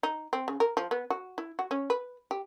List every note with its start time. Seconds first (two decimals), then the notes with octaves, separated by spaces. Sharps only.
0.03 D#4
0.33 C4
0.48 C#3
0.60 A#4
0.77 F3
0.91 B3
1.10 F#4
1.38 E4
1.59 F#4
1.71 C#4
1.90 B4
2.31 G4